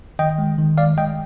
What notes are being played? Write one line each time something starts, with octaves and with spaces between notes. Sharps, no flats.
D#3 D#5 G5
G#3
D#3
G#3 D5 F5
G#3 D#5 G5